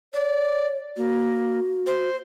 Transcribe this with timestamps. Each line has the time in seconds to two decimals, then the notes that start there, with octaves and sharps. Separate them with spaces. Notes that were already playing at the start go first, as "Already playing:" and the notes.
0.14 C#5 D5
0.97 A#3 F#4
1.87 C5